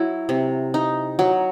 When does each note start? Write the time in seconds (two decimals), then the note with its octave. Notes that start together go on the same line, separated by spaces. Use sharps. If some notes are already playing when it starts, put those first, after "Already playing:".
Already playing: F#3 E4
0.29 C3
0.74 D#4
1.19 F#3